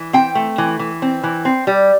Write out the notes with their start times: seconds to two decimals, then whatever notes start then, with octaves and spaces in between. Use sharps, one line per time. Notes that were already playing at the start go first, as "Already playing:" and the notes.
Already playing: E3
0.13 C4 G5
0.35 A3
0.58 E3
0.79 E3
1.02 C4
1.23 E3
1.45 C4
1.67 G3